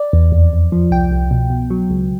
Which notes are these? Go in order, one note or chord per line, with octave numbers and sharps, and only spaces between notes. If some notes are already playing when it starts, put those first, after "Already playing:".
Already playing: D5
E2
F2
F2
F3
C2 G5
C2
B2
B2
F#3
C#2